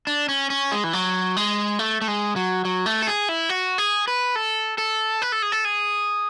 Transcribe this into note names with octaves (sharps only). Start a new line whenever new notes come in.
D4
C#4
C#4
G#3
E3
F#3
G#3
A3
A3
G#3
F#3
F#3
A3
A4
G#4
E4
F#4
G#4
B4
A4
A4
B4
A4
G#4
A4
G#4